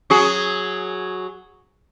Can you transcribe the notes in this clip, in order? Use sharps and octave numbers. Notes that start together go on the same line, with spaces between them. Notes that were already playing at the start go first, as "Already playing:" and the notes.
F#3 F#4 G#4